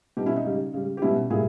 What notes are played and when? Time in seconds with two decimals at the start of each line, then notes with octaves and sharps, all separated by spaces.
0.17 B2 G3 D#4 G4
0.26 C#4 E4
0.36 D#4
0.46 C#3 G3
0.74 C#3 G3
0.97 G4
1.02 B2 G3 C#4 E4
1.30 A#2 G3 E4 G#4